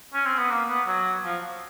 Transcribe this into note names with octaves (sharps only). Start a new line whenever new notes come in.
C#4
C4
B3
A#3
B3
F#3
F3